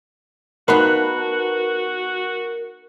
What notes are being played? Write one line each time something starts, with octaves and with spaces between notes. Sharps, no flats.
B3 D#4 F#4 A#4 B4 F5 A5 B5